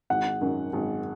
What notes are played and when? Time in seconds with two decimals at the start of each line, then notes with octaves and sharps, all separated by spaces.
0.10 G#1 F#5
0.41 F#2 D#3
0.73 G#1